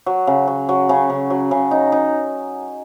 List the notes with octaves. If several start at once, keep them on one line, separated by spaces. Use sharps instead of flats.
F#3
C#3
F#3
F#3
C#3
C#3
F#3
C#3
D#4
D#4